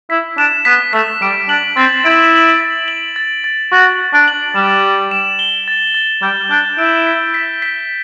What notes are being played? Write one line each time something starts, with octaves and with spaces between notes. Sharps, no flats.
E4 B6
D4 E7
B3 B6
A3 B6
G3 D7
D4 F#7
C4 A6
E4 D7
F#7
A6
F#7
A6
A6
F#4 A6
A6
D4
F#7
G3 E7
A6
E7
G7
A6
A6
G3 G6
D4 G6
E4 D7
B6
B6
B6